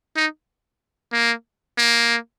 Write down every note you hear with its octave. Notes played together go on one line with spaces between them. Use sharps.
D#4
A#3
A#3